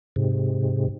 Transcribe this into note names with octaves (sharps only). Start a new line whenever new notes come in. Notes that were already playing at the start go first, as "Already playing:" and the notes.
G#2 C3